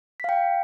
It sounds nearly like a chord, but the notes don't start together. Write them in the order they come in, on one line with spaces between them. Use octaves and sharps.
B6 F5 G5